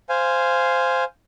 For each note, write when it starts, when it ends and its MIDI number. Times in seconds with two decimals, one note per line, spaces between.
0.09 1.04 72
0.09 1.04 77
0.09 1.04 80